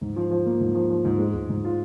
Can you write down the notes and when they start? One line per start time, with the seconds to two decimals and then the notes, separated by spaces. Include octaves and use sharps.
0.01 G#2
0.16 F3
0.31 F3
0.46 A#3
0.60 G#2
0.75 F3
0.90 F3
1.05 G#2
1.19 G#3
1.34 G#2
1.49 G#2
1.64 F4